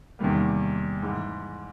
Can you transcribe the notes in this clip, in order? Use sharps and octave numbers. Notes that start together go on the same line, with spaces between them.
E2 C3 D#3 G3 A#3
G#2 E3 G#3